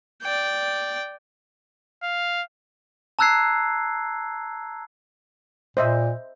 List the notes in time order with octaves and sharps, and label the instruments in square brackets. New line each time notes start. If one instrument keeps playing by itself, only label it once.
[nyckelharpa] D5 G5
[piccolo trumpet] F5
[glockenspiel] A5 A#5 E6 F#6 G#6 C7
[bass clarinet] A#2 [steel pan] C5 D#5 E5